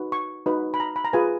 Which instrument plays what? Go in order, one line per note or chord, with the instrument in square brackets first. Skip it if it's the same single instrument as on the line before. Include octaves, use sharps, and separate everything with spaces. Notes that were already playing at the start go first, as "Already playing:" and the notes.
Already playing: [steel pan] D#4 F#4 B4
C#6
D#4 F#4 B4
B5
A#5
B5
A#5
F4 G#4 B4 G#5